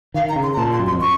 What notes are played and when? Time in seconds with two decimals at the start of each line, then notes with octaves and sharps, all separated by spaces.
0.14 D#3 F5
0.29 A#5
0.36 C#3
0.43 C6
0.53 A#5
0.57 A#2 A5
0.73 C6
0.79 F#2
0.86 C6
0.92 F2
1.01 C#6